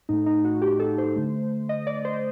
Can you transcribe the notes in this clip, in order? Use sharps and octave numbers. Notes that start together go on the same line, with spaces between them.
A2 A3 D#4
D#4
F#4
G4
A4
C5
D3 A3
D#5
D5
C5